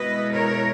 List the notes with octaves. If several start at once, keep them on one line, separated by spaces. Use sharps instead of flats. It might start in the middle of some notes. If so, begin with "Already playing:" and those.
Already playing: B2 G#3 B3 E4 B4 D#5
A#4 C#5